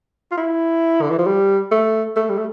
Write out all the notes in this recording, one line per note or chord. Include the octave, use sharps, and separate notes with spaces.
F4
E4
D3
E3
F3
G3
A3
A3
G3
A3